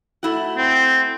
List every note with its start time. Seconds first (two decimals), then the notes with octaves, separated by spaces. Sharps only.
0.23 A3 E4 F#4
0.57 C4